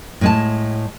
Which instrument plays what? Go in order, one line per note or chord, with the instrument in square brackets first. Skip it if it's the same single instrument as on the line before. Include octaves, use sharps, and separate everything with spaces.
[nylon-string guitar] A2 G#3 A5